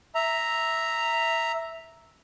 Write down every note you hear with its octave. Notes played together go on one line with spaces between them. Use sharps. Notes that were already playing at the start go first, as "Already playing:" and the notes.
E5 A#5